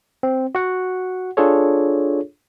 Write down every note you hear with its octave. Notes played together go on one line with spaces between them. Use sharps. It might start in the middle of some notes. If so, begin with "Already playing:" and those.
C4
F#4 F#5
D4 F4 G#4 A4 C#5